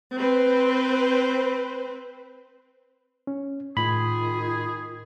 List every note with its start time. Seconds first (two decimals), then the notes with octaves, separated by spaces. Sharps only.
0.16 C4 B4 C5
3.27 C#4
3.77 A2 D#3 F4 G#4 B5